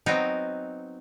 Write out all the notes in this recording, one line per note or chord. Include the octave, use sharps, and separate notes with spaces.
F#3 B3 C4 D#4